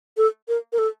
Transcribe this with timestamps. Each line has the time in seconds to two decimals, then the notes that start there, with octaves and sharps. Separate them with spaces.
0.17 A4
0.48 A#4
0.73 A#4
0.78 A4